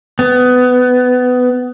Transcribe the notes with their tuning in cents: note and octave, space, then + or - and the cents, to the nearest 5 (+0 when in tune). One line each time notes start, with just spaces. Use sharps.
B3 +20